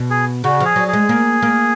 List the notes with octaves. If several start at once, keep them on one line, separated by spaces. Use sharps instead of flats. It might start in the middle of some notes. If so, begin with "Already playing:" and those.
Already playing: B2
G#4
C#3 F#4
F3 G#4
F#3
G#4
G#3
A#3
A#3